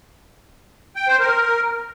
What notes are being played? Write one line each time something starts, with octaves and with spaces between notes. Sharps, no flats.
G5
C5
A#4